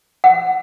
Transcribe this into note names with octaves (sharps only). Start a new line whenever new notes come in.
F#5